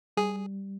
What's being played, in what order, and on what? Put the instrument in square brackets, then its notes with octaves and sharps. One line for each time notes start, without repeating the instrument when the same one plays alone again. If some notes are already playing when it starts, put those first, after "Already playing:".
[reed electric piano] G3 [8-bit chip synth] G#4